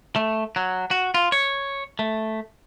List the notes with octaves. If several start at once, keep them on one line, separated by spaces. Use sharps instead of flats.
A3
F#3
F#4
F4
C#5
A3